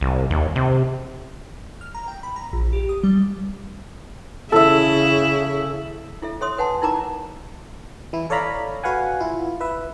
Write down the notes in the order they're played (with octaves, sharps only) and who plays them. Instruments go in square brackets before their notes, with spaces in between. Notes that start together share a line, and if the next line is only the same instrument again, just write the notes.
[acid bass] C2
D#2
C3
[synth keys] F6
A#5
G5
B5
A#5
A#1
G4
D#6
G3
[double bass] C#3 [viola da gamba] E4 [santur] A4 E5
[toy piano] E4 A4 E5
A4 C#5 E5 C6 D#6
B4 F#5 G#5 A5 C6
D#4 E4 A#4 A5 A#5 D6
[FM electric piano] E3 E4
A4 C#5 D5 F5 A#5 B5
F#4 B4 F5 F#5 G#5
E4 F4
B4 E5